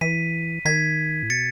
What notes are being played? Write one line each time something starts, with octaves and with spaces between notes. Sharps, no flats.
E3 B6 D#7
D#3 G#6 B6
A2
B2 A6 C#7